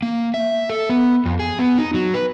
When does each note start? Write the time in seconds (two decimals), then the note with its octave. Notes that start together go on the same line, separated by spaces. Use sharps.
0.02 A#3
0.34 E5
0.70 A4
0.90 B3
1.25 F2
1.39 G#4
1.59 B3
1.78 D#4
1.94 F#3
2.14 B4